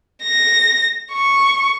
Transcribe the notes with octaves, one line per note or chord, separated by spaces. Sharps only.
A#6
C#6